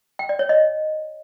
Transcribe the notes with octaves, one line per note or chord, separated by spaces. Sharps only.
G5
D5
C#5
D#5